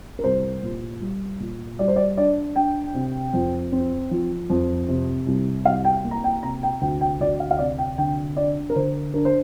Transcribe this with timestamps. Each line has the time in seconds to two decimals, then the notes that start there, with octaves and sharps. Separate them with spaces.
0.19 A#4
0.24 C2 C5
0.63 A#2
1.01 G3
1.40 A#2
1.79 G3 D5
1.88 C5
1.96 D5
2.17 D4 D5
2.56 D4 G5
2.94 C3
3.34 F2
3.72 C4
4.11 F3
4.50 F2
4.88 C3
5.26 C2
5.65 C2 F5
5.85 G5
6.04 A#3
6.11 A#5
6.24 G5
6.43 C3 A#5
6.63 G5
6.81 D2 G5
7.01 G5
7.20 D2 D5
7.40 F5
7.51 F5
7.59 C3 D5
7.78 G5
7.98 D3 G5
8.37 D4 D5
8.70 A#4
8.76 D3 C5
9.14 D4 A#4
9.25 C5